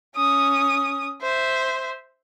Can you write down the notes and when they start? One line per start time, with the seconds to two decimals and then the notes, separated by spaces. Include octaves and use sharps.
0.16 C#4 D#6
1.22 C5 E5